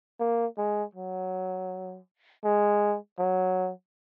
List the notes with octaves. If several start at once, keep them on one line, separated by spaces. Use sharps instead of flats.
A#3
G#3
F#3
G#3
F#3